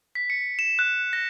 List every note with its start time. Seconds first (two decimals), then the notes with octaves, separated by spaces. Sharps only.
0.15 B6
0.30 C#7
0.59 E7
0.79 F#6
1.13 A#6